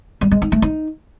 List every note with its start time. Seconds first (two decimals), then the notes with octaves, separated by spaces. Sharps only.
0.21 G3
0.31 G#3
0.42 D#4
0.52 A3
0.62 D#4